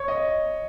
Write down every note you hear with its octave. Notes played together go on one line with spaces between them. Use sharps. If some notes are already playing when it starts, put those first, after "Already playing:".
Already playing: C#5
D#5